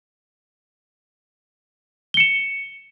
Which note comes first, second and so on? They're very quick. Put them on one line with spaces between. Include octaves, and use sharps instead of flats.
G7 C#7 E7